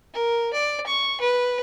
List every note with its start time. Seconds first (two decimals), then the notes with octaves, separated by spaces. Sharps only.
0.13 A#4
0.53 D5
0.86 C#6
1.20 B4